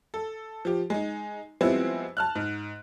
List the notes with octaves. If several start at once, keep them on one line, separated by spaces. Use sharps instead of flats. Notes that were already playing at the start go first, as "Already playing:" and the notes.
A4
F3 G4
G#3 D#4
F3 G3 G#3 B3 C4 E4
A5 F6 F#6
G#2